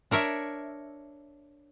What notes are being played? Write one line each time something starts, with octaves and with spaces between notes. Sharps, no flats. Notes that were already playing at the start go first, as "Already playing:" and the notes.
D4 A#4 C#5 E5